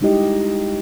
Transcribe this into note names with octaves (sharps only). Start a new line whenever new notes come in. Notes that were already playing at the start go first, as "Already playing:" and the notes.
G3 G#3 D#4 E4 G4 D#5